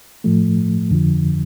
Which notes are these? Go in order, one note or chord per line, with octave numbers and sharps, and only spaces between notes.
A2 F3 A3
F2 D3 F3